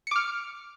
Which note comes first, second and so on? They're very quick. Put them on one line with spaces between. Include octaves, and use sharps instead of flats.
C#7 D6 F6